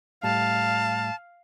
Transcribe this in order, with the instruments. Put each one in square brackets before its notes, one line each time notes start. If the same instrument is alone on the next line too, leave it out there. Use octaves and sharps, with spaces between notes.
[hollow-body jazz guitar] A2 G3 [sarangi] F5 [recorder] A5